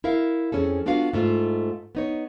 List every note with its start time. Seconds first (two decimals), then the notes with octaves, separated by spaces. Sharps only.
0.04 E4 A#4 E5 F5
0.52 F2 C3 C#4 G#4 A4
0.86 B3 D4 F4 F#4 F5
1.13 G#2 A3 F4
1.95 B3 D#4 C#5